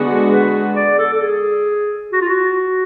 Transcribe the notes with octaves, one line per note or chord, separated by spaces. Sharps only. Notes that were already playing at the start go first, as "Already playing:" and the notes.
Already playing: D3 G#3 B3 F#4
B4
D5
A4
A4
G#4
F#4
F4
F#4